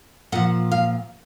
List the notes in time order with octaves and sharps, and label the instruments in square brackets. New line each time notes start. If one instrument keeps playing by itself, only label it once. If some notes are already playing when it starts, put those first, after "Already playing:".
[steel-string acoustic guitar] A#2 F3 F#5
F5